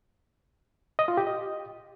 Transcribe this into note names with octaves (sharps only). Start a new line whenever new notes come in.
D#5
F4
G4
D#5